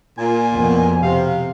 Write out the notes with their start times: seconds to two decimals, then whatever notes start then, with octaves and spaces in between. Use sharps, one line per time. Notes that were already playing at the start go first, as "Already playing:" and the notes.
0.18 A#2 G#5
0.53 F2 B2
1.03 C3 F5